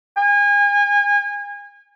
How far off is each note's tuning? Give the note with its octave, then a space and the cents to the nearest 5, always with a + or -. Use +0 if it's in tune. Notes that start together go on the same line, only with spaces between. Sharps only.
G#5 -35